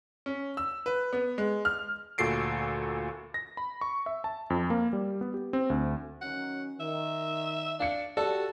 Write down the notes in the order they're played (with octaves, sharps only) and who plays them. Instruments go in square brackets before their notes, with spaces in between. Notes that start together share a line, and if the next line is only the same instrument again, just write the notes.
[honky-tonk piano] C#4
E6
B4
B3
G#3
F6
[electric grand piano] D2 A#2 F#4 A4 C7 D7
A#6
B5
C#6
E5
A5
F2
A#3
G3
B3
G4
C4
D2
[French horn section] D#3 F#3 C#4 [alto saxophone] F#5
[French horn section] D#3 [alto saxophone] E5
[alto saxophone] D4 [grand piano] F5 C#7
[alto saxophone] F#4 [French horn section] G4 [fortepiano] A4 [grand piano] D5